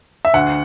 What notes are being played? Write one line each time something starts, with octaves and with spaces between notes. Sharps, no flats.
E5
D2 F#5